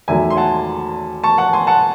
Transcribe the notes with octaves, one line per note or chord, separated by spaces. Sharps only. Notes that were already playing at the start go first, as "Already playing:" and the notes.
E2 D#3 F#3 A3 E5 G#5
C6
F#5 A5
A5 C#6
F#5 A5
G#5 C6
F#5 A5